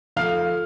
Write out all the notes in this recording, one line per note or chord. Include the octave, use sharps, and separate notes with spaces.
F3 A3 F5 F6